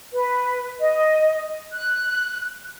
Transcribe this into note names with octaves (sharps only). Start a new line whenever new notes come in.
B4
D#5
F#6